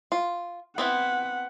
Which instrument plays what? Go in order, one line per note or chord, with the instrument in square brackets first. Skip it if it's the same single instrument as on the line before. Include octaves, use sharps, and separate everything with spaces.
[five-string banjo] F4
[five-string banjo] B3 C4 E4 [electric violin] F#5